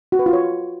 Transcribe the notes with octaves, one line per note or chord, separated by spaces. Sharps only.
F#4
B4
F4
C#5